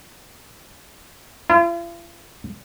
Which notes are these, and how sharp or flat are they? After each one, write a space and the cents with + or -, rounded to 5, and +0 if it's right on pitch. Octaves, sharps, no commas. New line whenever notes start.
F4 -45